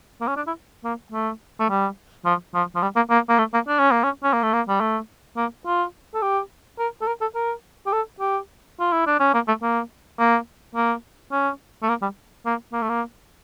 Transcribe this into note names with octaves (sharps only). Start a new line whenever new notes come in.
A#3
C#4
D4
E4
A#3
A3
A3
G3
F3
F3
F3
G3
A#3
A#3
A#3
A3
A#3
D4
C#4
A#3
C#4
C#4
A#3
A3
A#3
G3
A3
A#3
F4
A4
G4
A#4
A4
A#4
A4
A#4
G4
A4
G4
F4
E4
D4
C#4
A#3
A3
A#3
A#3
A#3
C#4
A3
A#3
G3
A#3
A#3
A3
A#3